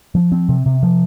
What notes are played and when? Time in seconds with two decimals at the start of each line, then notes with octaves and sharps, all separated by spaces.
0.15 F3
0.32 C4
0.49 C3
0.66 C3
0.83 F3